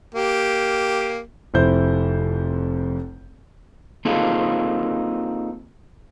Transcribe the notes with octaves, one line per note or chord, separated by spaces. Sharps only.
A#3 G4
F1 F2 E4 C5 G6
A#3 C4 D#4 F4 G#4 A4